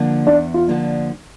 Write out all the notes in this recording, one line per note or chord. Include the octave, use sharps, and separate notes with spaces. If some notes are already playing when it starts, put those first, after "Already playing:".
Already playing: D3 F3 A#3 D4
E2 D4
F4
D3 F3 A#3 D4